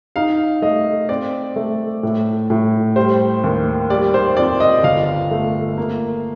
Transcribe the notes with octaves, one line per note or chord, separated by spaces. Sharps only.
D#4 F5
A3 D#5
C4 D5
A3
A2
A2
G3 C5
D#2
G3 D5
C5
F2 D5
D#5
G1 F5
A3
A#3